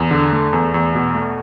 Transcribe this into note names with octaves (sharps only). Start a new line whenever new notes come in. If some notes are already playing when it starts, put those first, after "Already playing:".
Already playing: E2
D3
A3
E2
E2
B2
A3